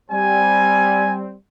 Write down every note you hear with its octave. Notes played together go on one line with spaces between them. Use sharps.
G3 C4 G#5